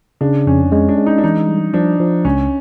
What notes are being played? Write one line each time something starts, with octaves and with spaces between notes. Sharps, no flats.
C#3 D4
F2 C#4
G#3 C#4
D4
G#3
D#4
D4
E3 D#4
G3
F3 D4
F3
C#2 C#4